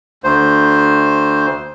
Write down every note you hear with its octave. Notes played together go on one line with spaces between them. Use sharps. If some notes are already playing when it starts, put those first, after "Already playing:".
D2 C5